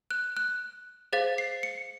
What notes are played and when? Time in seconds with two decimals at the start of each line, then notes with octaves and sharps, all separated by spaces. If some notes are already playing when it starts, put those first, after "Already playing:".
0.11 F#6
0.37 F#6
1.13 G#4 C5 F5 A6
1.38 C7
1.63 C#7